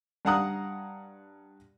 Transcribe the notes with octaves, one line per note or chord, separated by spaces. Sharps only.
G2 F5 F#5 A#5 D#6 F#6